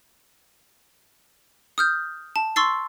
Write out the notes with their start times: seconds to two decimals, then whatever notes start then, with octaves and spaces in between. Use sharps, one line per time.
1.78 D#6 F6 G6
2.36 A5
2.56 C6 C#6 E6 A6 C7